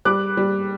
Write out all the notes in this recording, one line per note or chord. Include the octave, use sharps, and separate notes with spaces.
G3 D6 F#6
G3